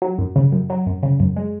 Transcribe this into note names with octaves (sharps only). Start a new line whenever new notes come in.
F#3
F#2
C#3
F#2
F#3
F#2
C#3
F#2
G#3